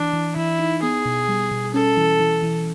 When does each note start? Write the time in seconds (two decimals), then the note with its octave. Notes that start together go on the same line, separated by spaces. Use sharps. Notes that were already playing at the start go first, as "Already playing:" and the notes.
Already playing: E3 D4
0.13 E3
0.36 E3 E4
0.60 D#4
0.83 B3 G#4
1.06 B2
1.29 G3
1.51 B2
1.74 C#4 A4
1.97 E3
2.20 E3
2.43 E3